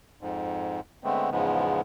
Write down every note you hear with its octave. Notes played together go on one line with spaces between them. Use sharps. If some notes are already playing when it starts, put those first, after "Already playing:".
F2 G#2
D3 G#3 A3 B3 C4
E2 G#2 C#3 F3 G#3 B3